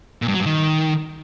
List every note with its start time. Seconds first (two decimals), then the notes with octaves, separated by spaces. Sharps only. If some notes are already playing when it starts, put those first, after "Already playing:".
0.22 A#2
0.28 G2
0.34 F#3
0.40 G2
0.46 D#3